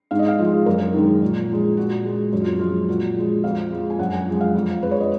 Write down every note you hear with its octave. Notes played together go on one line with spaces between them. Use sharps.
G#2 F5
D#5
F5
F3 G#3
F#2 A#4
D#3 G#3
A#2
F3 G#3
A#2 F#4
G#3
F#2 F#4
F4
F3 G#3 F4
A#2 F#4
F3 G#3
F2 F5
F3 G#3
G#5
F#2 F#5
G#5
F3 G#3
F5
F2
F3 G#3 B4
C#5
D#5